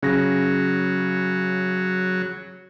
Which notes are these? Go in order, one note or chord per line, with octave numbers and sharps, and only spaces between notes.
C#3 F#3 A#6